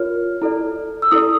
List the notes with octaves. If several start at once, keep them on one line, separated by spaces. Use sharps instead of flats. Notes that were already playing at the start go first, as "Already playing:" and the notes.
Already playing: F4 A#4 C#5 F6
E4 A4 D5
E6
E4 A4 D5 D#6